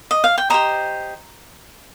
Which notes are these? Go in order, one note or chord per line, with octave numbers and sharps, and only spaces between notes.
D#5
F5
G5
G4 C5 D#5 A#5